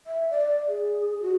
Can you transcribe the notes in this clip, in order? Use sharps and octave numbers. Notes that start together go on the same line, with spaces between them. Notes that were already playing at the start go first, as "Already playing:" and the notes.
E5
D5
G#4
F#4